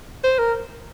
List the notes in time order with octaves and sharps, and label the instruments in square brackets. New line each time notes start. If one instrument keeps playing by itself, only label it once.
[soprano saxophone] C5
A#4